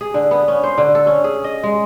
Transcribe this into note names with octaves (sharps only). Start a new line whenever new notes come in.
G#4
D3
B3
C#4
C5
D3
A4
C#4
G#4
D#5
G#3